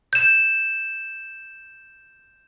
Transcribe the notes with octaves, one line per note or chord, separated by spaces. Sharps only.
G6 E7